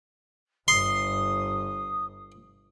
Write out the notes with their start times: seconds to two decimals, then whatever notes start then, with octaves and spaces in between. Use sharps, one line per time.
0.68 G1 C6 D#6